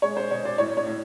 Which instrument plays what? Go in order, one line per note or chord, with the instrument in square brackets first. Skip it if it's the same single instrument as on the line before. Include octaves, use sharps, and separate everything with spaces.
[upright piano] G#3 C#5
C5
B2 C#5
C5 D5
A2 C#5
C#5
A2